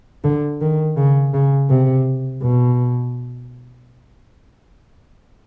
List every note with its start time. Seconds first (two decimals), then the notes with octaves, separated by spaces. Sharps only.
0.24 D3
0.61 D#3
0.97 C#3
1.34 C#3
1.70 C3
2.43 B2